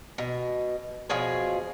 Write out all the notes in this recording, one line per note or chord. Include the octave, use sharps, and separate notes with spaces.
B2
B2 F3 G#4 C#5